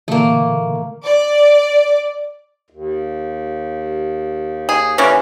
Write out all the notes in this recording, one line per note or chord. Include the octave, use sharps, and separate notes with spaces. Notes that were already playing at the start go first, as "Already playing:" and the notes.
A#2 D3 E3 A3 A#3
D5
D#2
G#4
D3 E3 C#4